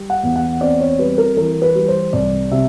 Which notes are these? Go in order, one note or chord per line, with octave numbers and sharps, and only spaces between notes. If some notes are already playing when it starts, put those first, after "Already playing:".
Already playing: G3
F#5
E2
F#5
C4 D5
C#5
G3 B4
A#4
E3 A#4
B4
G3
C5
C2 D5
C3 E5